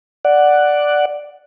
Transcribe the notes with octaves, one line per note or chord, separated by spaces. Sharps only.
D5 F#5